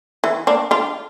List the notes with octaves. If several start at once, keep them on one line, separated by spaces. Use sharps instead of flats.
E3
A#3 D4
D4 F4